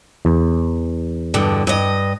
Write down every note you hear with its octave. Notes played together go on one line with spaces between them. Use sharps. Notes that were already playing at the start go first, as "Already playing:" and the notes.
E2
G2 B2 D3
G2 D#5